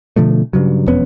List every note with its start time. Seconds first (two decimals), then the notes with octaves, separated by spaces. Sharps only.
0.16 B2 D3 F3 A3
0.53 G2 C#3 F#3
0.87 E1 F2 B3 C#4